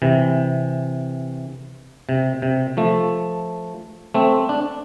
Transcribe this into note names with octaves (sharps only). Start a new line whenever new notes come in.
C3 E3
C3
C3
F3 A3
A3 C4
D4